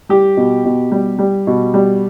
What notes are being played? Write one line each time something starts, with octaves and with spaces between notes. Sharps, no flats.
G3 G4
B2
B2
G3
G3
B2
G3